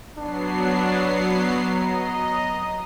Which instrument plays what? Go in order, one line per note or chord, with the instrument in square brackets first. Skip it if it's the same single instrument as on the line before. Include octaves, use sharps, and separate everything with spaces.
[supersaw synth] F#3 B3 C7 [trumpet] D4
[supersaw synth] D#5 [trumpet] A#5